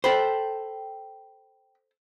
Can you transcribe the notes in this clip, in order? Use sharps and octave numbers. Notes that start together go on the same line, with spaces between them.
A4 C5 G5 B5